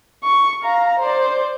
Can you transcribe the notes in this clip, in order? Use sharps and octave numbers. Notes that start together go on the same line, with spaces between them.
C#6
F5 A#5
C5 D5